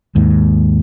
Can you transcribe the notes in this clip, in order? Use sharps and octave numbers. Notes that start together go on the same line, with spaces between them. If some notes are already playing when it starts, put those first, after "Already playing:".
D#2 G#2